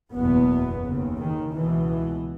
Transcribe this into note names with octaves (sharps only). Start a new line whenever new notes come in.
F#1 E2 B2 B3
D#2 C#3
D#3
C#2 B2 E3